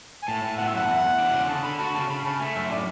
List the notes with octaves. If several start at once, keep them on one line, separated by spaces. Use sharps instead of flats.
G#5
A2 A5
A2
B3 F#5
E5
F#2 F#5
E2
E2
D4
C#3
D3 A5
D3 B5
F#4 A5
C#3 A5
C#3 B5
C#3 A5
A3 G#5
F#2 E5
A2 D5